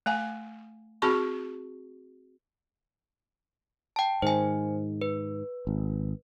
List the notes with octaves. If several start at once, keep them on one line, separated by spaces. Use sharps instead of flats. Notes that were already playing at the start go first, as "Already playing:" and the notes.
A3 F5 G#5
C4 F#4 G#4 A5 B5 C#6
G5 A5
G#2 D#3 C5 G#5
B4
G#1